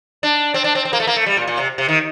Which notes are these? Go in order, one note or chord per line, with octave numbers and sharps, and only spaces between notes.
D4
C4
D4
C4
C4
A#3
A3
A#3
A3
G3
A#2
A#2
C3
C3
D#3